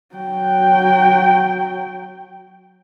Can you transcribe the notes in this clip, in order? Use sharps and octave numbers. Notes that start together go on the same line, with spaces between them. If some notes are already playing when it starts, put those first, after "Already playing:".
F#3 G5